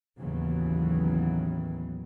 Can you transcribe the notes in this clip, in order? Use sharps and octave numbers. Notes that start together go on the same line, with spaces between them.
A1 D#2 C#3 E3 F#3 B3